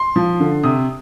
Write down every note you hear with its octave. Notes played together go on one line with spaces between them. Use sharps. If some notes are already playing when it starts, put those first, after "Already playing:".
Already playing: C6
F3
D3
C3 D#6